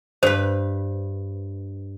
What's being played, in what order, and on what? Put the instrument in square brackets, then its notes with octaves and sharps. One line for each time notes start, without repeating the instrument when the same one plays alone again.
[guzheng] G2 B4 [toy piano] C5